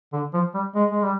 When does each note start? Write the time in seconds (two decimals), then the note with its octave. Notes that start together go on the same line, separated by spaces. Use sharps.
0.13 D3
0.33 F3
0.54 G3
0.75 G#3
0.91 G#3
1.03 G3